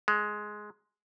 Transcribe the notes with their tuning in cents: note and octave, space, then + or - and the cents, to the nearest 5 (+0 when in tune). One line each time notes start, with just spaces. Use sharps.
G#3 +10